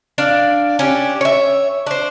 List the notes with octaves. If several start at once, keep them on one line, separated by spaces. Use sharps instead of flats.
D4 D5 F5
C#4 D4 G4
C#5 E5
D4 C5